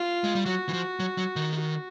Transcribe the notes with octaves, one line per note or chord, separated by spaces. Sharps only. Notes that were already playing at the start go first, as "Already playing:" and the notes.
Already playing: F4
G#3
G3
F#3 F#4
E3
F3
F#3
F#3
D#3
F#4